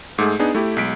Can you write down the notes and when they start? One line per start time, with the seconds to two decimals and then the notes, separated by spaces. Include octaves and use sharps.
0.18 G#2 A3 G#4
0.39 B3 D4 D#4 G#4
0.55 A3 E4 G4
0.77 B1 G#3 B6 D7